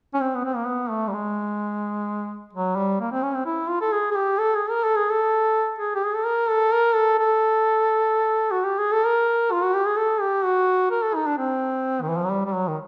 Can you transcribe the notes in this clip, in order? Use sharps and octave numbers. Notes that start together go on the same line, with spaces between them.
C#4
C4
B3
C4
A#3
B3
A3
G3
G#3
F#3
G3
A#3
C4
C#4
C4
E4
F4
A4
G#4
G#4
G4
A4
G#4
A#4
A4
G#4
A4
G#4
G4
G#4
A4
A#4
A4
A#4
A4
A4
F#4
G4
G#4
A4
A#4
F4
F#4
G4
G#4
A4
G4
F#4
A#4
A4
D#4
D4
C4
D#3
E3
F3
F#3
G3
G3
F#3
D#3